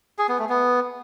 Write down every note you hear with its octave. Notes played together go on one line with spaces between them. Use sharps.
G#4
B3
A3
B3